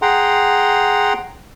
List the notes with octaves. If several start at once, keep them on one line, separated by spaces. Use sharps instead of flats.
G#4 F#5 G5 A#5 C6